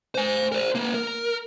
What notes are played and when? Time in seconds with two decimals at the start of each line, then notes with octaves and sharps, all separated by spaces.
0.15 C5 G#5
0.52 A#4 C5
0.75 A#3 B4
0.94 A#4